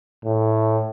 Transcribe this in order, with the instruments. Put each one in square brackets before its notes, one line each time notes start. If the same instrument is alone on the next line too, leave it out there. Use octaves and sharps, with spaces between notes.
[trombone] A2